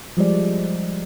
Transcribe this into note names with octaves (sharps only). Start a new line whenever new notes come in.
F3 G3 G#3 D5